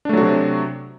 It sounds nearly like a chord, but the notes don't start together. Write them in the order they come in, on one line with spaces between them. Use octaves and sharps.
D4 A3 F#3 F#4 C3